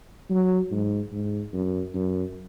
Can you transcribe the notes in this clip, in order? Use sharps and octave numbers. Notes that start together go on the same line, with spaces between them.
F#3
G#2
G#2
F#2
F#2